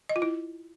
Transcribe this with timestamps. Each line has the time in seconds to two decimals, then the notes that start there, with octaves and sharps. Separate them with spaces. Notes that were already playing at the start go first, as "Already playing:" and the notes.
0.09 D#5
0.16 F4
0.22 E4